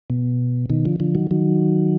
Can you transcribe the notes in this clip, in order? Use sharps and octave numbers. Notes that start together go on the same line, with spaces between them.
B2
B2 D#3
D3 F3
D3 F3
D#3 F#3
D#3 F#3